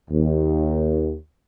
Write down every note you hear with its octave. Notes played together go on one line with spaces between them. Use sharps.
D#2